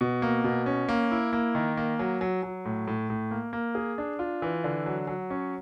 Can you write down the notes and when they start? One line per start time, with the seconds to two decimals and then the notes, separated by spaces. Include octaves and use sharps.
0.01 B2
0.22 A#3
0.44 B2
0.66 C#4
0.89 A#3
1.11 E4
1.33 A#3
1.55 D#3
1.77 A#3
1.99 F#3
2.21 F#3
2.43 F#3
2.65 A2
2.87 A2
3.10 A2
3.31 A#3
3.53 A#3
3.75 G#4
3.98 D4
4.19 F4
4.42 E3
4.64 D3
4.86 F#3
5.07 F#3
5.30 C#4